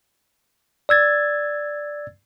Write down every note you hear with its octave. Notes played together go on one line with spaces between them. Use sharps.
D5 E6 G#6 A6